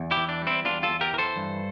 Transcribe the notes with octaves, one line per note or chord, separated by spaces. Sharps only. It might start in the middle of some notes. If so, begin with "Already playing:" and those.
Already playing: E2
E4 G4
E3
D4
G3
C4 E4
E2 D4 F4
F4 A4
E2
G4 A#4
E3 A4 A#4 C5
G2